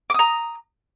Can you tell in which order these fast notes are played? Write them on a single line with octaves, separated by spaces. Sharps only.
D6 D#6 A#5